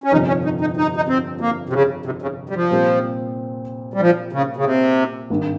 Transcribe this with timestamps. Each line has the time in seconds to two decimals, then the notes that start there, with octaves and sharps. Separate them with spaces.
0.04 C#4
0.12 G1 F2 C3 F3 D#4
0.28 C#4
0.44 D#4
0.61 D#4
0.77 D#4
0.96 D#4
1.08 C4
1.41 A#3
1.69 C3
1.73 C#3
2.06 C3
2.22 C#3
2.49 G3
2.55 F3
2.71 A#2 G3 C4 G4 A#4
3.94 G3
4.01 F3
4.33 C#3
4.57 C#3
4.65 C3
5.30 G#1 G2 D#3